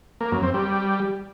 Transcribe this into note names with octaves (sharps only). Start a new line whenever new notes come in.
A#3
F#2
C4
G3